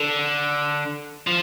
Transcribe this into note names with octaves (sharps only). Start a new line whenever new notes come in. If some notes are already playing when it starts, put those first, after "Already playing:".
Already playing: D3
F3